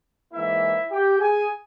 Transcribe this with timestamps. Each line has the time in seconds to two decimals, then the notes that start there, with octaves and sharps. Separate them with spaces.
0.32 G#2 E3 A#3 E4 E5
0.91 G4 G5
1.19 G#4 G#5